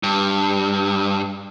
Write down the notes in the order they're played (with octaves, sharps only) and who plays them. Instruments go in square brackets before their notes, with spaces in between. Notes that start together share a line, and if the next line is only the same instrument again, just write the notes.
[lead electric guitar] G2